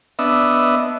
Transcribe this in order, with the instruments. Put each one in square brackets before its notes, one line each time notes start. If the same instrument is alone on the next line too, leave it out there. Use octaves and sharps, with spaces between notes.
[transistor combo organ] B3 D4 D#5 E5